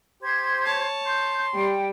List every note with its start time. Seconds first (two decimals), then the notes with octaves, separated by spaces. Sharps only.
0.23 G4 C5 C6 G#6
0.65 C#5 A5
1.06 C6 G6
1.54 G3 G5